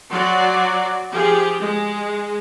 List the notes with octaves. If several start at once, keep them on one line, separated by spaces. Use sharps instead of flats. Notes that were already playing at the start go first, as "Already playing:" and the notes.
F#3 F#4 D5 C6
F3 G4 G#4
G#3